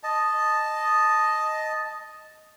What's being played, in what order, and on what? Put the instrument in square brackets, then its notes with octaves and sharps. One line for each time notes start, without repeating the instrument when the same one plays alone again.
[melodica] D#5 A5